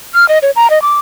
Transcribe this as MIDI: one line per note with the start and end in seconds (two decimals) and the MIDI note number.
0.15 0.28 89
0.29 0.38 75
0.42 0.51 73
0.56 0.69 82
0.70 0.82 75
0.82 0.99 86